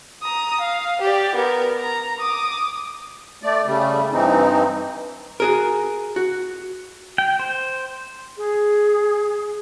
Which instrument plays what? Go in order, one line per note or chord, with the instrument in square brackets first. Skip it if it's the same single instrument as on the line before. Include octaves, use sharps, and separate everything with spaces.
[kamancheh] A#5 D#6
F5
G4 D5
B3 A#4
A#5
D6 D#6
[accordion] A3 D5
C#3 G3 A3
G2 E3 C4 D#4
[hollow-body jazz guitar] F#4 G#4 A#4
F#4
[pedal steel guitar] G5
C5
[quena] G#4